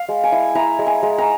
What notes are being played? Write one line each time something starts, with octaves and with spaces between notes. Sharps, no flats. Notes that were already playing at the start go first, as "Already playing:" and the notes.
Already playing: F5
G#3
G#5
E4
E4 A#5
G#3
G#5
G#3
A#5